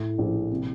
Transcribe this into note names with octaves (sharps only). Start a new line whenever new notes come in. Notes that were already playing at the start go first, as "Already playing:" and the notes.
Already playing: A2
A#1
C3